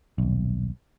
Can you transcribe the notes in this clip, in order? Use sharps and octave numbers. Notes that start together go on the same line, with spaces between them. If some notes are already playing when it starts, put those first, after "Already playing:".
D#1 B1